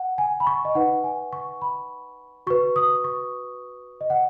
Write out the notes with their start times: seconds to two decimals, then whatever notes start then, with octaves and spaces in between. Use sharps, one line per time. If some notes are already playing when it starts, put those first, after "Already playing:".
Already playing: F#5
0.18 G#5
0.40 B5
0.47 C#6
0.65 D#5
0.75 D#4 B4 F#5
1.04 G#5
1.33 C#6
1.62 B5
2.47 F#4 B4 C#6
2.76 D#6
3.04 C#6
4.01 D#5
4.10 F#5